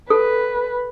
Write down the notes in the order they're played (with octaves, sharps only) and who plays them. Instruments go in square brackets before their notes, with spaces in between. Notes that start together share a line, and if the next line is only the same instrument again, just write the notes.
[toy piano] A4 [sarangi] B4